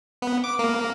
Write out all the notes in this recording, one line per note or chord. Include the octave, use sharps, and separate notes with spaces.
B3
D6
A#3